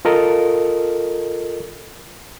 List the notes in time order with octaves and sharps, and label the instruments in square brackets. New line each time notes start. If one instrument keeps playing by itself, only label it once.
[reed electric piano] F4 A4 A#4 D#5